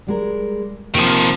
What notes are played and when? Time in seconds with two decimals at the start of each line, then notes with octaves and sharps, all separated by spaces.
0.07 G3 G#3 A#4
0.94 C3 D#3 F3 A#3 F4